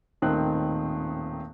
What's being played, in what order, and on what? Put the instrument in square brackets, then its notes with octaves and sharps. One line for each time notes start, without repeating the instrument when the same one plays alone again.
[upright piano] D#1 A1 D#3 C4 D#4 F#6